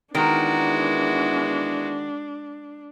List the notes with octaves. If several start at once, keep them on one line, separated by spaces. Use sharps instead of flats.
E2 D#3 G#3 B3 D4 E4 F#4 A#4